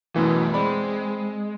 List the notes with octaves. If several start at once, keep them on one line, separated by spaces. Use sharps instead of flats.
F#2 B2 E3 A3 B3
G#3 C4 D5 B5